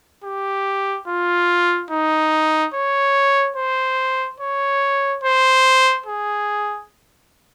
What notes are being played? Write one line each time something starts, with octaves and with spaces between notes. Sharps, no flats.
G4
F4
D#4
C#5
C5
C#5
C5
G#4